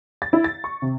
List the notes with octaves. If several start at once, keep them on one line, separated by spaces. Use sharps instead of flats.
A6
E4
A6
C#6
C3